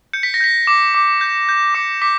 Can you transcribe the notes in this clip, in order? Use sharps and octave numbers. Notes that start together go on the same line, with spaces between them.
G6 C#7
B6
A#6
G6 B6
D6
D6
G6
G6
D6 C#7
D6 B6